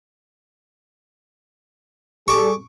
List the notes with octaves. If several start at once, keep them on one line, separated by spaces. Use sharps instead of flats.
G3 G#4 A4 C#6 D6